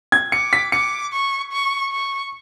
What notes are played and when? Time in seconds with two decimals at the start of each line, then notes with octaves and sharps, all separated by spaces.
0.12 G#6
0.32 D6 C#7
0.53 B6
0.72 D6 C#7
1.13 C#6
1.52 C#6
1.92 C#6